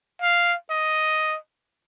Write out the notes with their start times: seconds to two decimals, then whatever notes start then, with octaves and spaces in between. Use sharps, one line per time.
0.21 F5
0.70 D#5